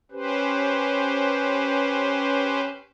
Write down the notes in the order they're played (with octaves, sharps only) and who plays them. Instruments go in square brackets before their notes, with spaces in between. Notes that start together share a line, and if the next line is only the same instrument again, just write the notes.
[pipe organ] C#4 G4 B4 C5